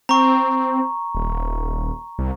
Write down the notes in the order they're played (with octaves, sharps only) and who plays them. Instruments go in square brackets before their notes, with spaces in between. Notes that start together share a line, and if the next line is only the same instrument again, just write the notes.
[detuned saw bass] C4 [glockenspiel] A#5 C#6
[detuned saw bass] D#1
C2